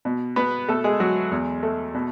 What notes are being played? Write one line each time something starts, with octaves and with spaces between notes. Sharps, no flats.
B2
B2 B3 B4
B2 A3 A4
G#3 G#4
F#3 G#3 F#4
E2
A3
B2